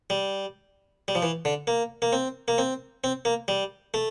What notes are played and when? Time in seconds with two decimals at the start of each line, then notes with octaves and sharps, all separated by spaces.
0.10 G3
1.08 G3
1.15 F3
1.22 E3
1.45 D3
1.67 A#3
2.02 A#3
2.13 C4
2.48 A#3
2.58 C4
3.04 C4
3.25 A#3
3.48 G3
3.94 A3